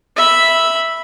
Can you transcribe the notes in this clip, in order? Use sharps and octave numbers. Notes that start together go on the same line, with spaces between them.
E5 B5